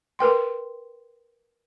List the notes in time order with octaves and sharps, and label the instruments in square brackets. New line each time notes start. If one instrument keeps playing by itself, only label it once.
[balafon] A#4 B4 G5 C6